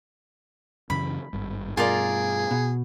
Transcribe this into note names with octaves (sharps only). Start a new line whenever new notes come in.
F#2 C#3 E3 B5
G#1 G2
G2 B2 F4 G#4 A#4 D5
B2